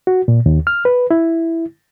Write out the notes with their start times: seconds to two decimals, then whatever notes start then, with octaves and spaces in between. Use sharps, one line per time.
0.07 F#4
0.28 A#2
0.46 D#2
0.67 F6
0.85 B4
1.11 E4